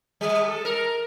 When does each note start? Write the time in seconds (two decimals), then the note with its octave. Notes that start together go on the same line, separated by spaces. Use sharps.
0.21 G3
0.48 A4
0.65 A#4